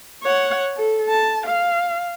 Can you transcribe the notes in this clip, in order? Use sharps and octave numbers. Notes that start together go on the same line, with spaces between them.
C#5 F#5
A4
A5
F5